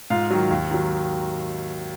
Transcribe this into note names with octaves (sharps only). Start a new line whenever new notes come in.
G#2 F4 F5
D#3 F#3
D#2
D#3 F#3